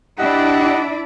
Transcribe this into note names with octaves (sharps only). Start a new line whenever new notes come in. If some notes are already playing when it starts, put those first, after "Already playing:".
D4 E4 G4 D5 D#5 F#5